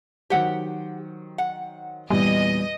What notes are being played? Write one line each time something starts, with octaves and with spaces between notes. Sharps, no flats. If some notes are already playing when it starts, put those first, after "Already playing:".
D#3 F#3 G4 C5 F#5
F#5
E2 A#2 E3 G3 D#5